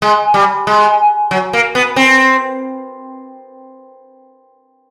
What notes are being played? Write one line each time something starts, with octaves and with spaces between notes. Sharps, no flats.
G#3
G3
G#3
F#3
A#3
B3
C4